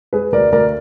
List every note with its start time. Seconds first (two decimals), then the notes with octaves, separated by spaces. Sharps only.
0.13 G#3 G#4 B4
0.32 D2 A#4 D5
0.52 D2 A#4 D5